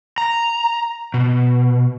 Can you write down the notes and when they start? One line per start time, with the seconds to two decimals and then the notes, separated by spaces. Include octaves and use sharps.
0.18 A#5
1.14 B2